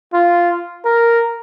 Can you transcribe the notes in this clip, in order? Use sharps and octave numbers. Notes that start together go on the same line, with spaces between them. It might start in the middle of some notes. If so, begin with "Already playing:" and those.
F4
A#4